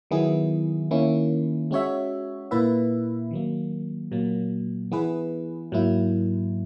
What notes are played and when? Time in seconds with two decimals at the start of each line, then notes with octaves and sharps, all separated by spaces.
0.11 D#3 F#3 B3 E4 G#4
0.91 D#3 A#3 C#4 E4
1.71 G#3 C#4 F#4 C#5 E5
2.51 A#2 A#3 E4 B4 E5
3.31 D#3 F#3 A#3
4.12 A#2 F#3 A#3
4.92 E3 B3 E4 G#4 B4
5.72 G#2 F#3 A#3 E4